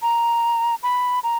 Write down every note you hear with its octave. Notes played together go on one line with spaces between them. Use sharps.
A#5
B5
A#5